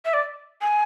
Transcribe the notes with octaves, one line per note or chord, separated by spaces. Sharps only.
E5
D5
G#5